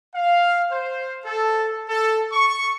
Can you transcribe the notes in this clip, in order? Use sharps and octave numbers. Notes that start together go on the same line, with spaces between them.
F5
C5
A4
A4
C#6